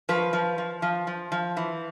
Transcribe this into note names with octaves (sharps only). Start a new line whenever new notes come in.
F3 B4
F3
F3
F3
F3
F3
E3